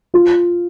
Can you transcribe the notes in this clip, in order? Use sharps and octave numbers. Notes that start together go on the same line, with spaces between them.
F4